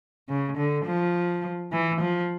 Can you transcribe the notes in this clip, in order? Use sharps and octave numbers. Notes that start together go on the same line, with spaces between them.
C#3
D3
F3
E3
F3